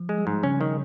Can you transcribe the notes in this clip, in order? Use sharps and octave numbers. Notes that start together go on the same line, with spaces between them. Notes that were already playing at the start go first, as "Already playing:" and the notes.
Already playing: F3
G#3
G3
G#2
C#3 C#4
D#3